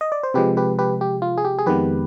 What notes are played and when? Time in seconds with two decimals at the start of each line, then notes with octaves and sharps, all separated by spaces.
0.01 D#5
0.12 D5
0.23 C5
0.34 C3 F3 G#3 G4 B4
0.57 G4 B4
0.79 G4 B4
1.01 G4
1.22 F4
1.38 G#4
1.45 G4
1.59 G#4
1.66 F2 D#3 G#3 B3 G4 B4